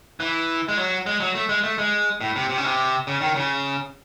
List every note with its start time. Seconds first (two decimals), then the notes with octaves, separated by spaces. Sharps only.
0.20 E3
0.68 G#3
0.77 F#3
1.06 G#3
1.20 F#3
1.35 A3
1.49 G#3
1.64 A3
1.78 G#3
2.21 A2
2.36 C3
2.50 C3
2.58 C#3
2.64 C3
3.07 C#3
3.21 D#3
3.36 C#3